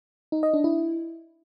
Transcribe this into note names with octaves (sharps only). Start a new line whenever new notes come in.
D#4
D#5
D4
E4